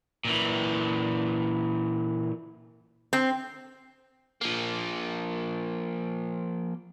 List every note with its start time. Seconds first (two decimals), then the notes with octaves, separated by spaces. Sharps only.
0.25 A#2 E3
3.13 C4
4.41 F3 A#3